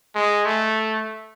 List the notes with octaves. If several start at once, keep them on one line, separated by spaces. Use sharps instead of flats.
G#3
A3